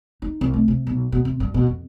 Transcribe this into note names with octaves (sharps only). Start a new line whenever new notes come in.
D#4
C2
A3
C3
B1
B2
C3
G2
B2
F2